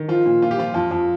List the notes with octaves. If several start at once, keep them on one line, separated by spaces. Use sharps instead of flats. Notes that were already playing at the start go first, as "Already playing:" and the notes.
Already playing: D#3
F3 F4
A#2
A#2 F4
G4
F3 F4
F2 F4
F2